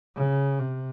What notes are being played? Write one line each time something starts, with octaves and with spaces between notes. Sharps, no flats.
C#3
C3